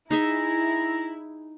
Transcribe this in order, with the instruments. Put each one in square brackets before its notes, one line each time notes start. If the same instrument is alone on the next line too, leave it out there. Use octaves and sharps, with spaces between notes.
[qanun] D#4 G#4 E5 [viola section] E4 [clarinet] A#5